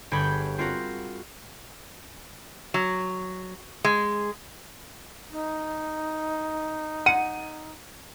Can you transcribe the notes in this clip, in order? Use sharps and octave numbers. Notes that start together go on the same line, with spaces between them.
G1 G4 G#4 C#5 B5 G6
C4 F4 F#4 A#4
F#3
G#3
D#4
F#5 D#7